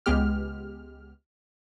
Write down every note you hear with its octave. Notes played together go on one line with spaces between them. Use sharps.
C#2 G#3 B3 G4 F6